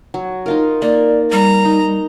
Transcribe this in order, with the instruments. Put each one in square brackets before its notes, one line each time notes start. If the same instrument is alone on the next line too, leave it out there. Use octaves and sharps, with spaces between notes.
[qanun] F#3
D#4 F4 A#4
[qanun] A#3 [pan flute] D5
[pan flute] G3 [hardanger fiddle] A#5
[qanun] D#4